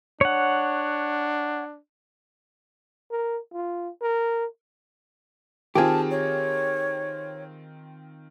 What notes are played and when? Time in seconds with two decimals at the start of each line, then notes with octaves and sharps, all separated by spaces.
0.21 D4 C#5 F#5
3.11 A#4
3.53 F4
4.01 A#4
5.75 D#3 C4 F4 G4 G#4 A5
6.11 C#5